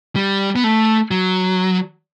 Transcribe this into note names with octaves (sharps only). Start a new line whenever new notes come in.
G3
B3
A3
F#3